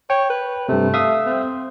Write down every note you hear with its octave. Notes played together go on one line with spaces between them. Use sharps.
C#5 G5
B4
G2 C3 A3
E5 F5 D#6
C4